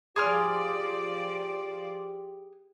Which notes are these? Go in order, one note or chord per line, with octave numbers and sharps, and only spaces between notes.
F3 F4 G4 G#4 D5 C6 F6